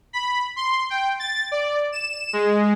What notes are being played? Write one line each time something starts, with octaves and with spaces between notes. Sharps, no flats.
B5
C6
G5
A6
D5
E7
G#3